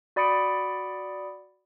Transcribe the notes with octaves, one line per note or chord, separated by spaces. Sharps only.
F#4 D5 B5 D#6 C#7 D7